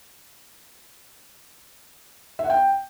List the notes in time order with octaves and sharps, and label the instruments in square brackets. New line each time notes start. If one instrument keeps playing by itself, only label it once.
[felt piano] E5
F#5
G5